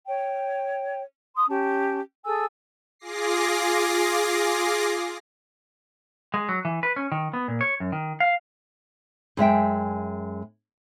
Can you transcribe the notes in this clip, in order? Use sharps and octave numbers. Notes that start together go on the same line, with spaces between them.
C#5 G5
C6 D#6
C#4 G4 A5
G#4 A4 G#5 E6
F4 G#4 D6 A#6 C7
G#3
F#3
E3
B4
C#4
D#3
B3
A#2
C#5
F#2
D#3
F5
F#2 G#3 E5 G5